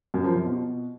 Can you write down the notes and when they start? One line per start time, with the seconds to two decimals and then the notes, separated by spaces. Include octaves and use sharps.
0.14 F#2
0.24 F3
0.34 C3
0.45 B2